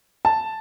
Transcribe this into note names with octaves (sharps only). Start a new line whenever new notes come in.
A5